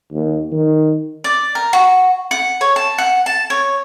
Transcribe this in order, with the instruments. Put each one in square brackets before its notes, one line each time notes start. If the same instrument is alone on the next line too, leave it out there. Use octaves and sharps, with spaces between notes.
[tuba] D#2
D#3
[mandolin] D5
A#4
F#4
F#5
C#5
A5
F#5
A5
C#5